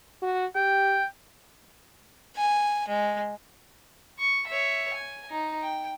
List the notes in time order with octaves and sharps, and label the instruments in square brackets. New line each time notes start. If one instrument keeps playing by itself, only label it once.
[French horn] F#4
[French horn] G4 [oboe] G5
[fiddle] G#5
G#3
[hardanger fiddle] C#6
C#5 E5
G#5
D#4
G5